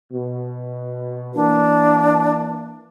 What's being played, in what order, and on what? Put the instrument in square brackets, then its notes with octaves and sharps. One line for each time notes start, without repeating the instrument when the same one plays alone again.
[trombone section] B2
[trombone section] E3 A#3 [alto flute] D4